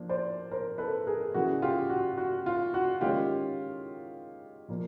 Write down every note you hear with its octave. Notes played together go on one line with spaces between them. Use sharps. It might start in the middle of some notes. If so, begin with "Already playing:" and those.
Already playing: F3 A#3 D4
C5 D5
A#4 C5
A4 B4
G#4 A#4
C#3 E3 G3 F#4 G#4
F4 G4
F#4
F#4
F4
F#4
D#3 G#3 C#4 F4 G4
A#2 F3 A#3